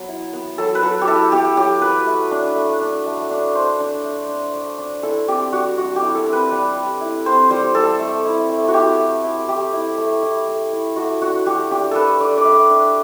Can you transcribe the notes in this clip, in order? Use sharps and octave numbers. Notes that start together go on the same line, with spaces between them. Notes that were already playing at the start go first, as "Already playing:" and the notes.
Already playing: F#3 B3
E4
B3
F#3 A4
B4
F#3 A4
G4
E4 A4
B3 G4
F#3 G4
F#3 B4
A3
D4
A3
D4
A3
D4
A3 C5
D4
A3
D4
A3
D4
E4 A4
C4 G4
G3 F#4
G3 F#4
G4
E4
A4
C4
B4
G3
G3
E4
C4 C5
G3 C5
G3 A4
A3
E4
A3
F#4
E4 G4
A3
E4
A3 G4
E4
A3
E4
A3
E4
A3 F#4
D4 F#4
A3 G4
D4 G4
A3 A4 B4
D4 D5
D5
A3 E5
D4